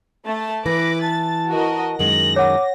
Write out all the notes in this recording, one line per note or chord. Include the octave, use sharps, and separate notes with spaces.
A3 A5
E3 B4 B5 D6 A#6
A5 A6
F#4 A#4 D#5
F#2 D#3 G#3 A#6 F#7
C#5 F#5 D6